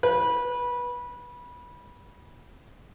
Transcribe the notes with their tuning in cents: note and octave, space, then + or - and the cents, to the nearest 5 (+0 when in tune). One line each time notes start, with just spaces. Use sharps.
B4 -20